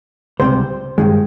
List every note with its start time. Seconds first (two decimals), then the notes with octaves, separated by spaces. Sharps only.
0.40 C#2 C3 G3 C5
0.98 G2 D#3 G#3